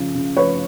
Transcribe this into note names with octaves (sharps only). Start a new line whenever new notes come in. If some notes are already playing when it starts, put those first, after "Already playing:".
Already playing: C#3 F3
C#3
F3 B4 C#5